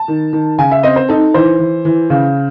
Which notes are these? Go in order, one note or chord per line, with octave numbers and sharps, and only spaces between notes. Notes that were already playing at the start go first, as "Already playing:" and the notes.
Already playing: A5
D#3
D#3
C#3 G#5
E5
C4 D#5
C5
D#4 A4
E3 C5
E3
E3
C#3